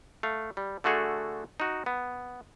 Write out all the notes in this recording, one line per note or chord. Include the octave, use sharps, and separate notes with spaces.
A3 F5
G3
D3 A3 F#4 G#4 A4
D#4 F#4
B3